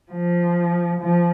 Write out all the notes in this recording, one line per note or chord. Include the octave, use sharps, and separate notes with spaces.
F3
F3